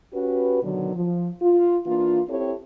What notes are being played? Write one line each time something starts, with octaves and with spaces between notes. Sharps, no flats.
C#4 F#4 G4 B4
B2 D3 D#3 F#3
F3
F4
E3 A#3 D4 F4
C4 E4 G4 A4 C#5